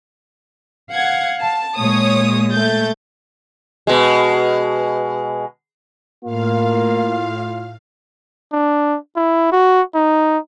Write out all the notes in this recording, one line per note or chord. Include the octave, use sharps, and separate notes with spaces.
F5 F#5 G#6
A5
A#2 G#3 C#5 D#6
A3 G6 A6
B2 G#3
A2 A#3 F4 F5
D4
E4
F#4
D#4